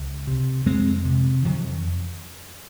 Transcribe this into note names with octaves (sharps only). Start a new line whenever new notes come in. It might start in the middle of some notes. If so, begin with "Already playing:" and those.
Already playing: C#2
C3
F2 G#3 C4
C3
F2 D#3 F#3